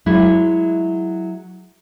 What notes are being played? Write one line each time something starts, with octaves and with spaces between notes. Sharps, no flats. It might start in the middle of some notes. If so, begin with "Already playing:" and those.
F#3 G#3 E4